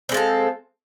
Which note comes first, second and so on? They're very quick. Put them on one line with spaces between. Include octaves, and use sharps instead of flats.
C4 G#3 F4 A4